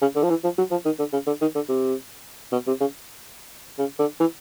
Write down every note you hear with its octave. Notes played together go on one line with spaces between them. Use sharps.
C#3
D3
F3
E3
F3
F#3
F3
D#3
D3
C#3
D3
D#3
D3
C3
B2
C3
C#3
C#3
D3
E3